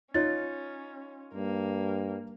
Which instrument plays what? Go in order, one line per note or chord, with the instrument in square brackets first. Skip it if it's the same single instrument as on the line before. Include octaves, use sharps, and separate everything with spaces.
[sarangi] C#4 [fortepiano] D#4 F4 [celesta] C#5 A6
[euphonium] G2 [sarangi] A#3